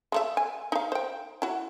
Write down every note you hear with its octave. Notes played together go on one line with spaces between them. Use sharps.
G#3 A3 E5
G#5
D#4 F5
C5 G5
E4 F#4